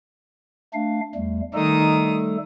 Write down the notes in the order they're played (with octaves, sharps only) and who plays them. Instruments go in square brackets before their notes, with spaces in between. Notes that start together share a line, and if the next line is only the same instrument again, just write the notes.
[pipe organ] A3 D4 F5
E2 G3 A3
[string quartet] D#3 D#4 D#6 [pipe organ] G3 A3 A4